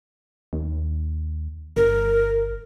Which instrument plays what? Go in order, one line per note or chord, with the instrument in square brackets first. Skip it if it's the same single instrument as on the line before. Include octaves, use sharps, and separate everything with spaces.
[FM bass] D#2
[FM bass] G1 [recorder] A#4